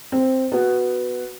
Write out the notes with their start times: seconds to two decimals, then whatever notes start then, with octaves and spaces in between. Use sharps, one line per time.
0.12 C4
0.52 B3 F#4